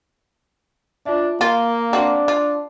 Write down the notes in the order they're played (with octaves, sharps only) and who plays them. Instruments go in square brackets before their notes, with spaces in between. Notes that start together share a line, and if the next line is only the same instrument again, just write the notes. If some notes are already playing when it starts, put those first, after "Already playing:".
[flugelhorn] D4 [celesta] F4 E5
[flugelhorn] A#3 [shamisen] F4 [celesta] F5 G7
[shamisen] C4 F#4 [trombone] D4
[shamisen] F4